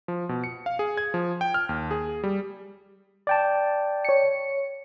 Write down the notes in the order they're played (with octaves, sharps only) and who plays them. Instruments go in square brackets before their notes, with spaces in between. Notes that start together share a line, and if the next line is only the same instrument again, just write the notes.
[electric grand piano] F3
B2
C#7
F5
G#4
G#6
F3
G5
F6
D#2
G#4
G3
[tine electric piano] D5 G5 A5
[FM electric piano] C#5 C#7